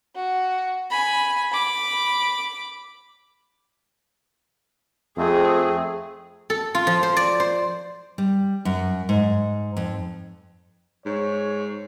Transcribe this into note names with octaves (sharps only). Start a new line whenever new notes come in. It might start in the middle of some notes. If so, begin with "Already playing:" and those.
F#4
G#5 B5
B5 D6
F2 A3 C4 G#4
A4
F4
F3
C5
D5
C5
G3
F#2
G#2
F2
G#2 C#5